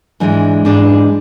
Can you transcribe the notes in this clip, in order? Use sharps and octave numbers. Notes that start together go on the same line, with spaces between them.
G#2 E3 G#3 D4
G#2 E3 G#3 D4